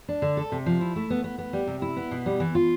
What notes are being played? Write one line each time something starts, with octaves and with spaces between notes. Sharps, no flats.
D4
D3
A4
C3
F3
E4
A3
B3
B3
B3
G3
C3
E4
B3
B2
G3
E3
F4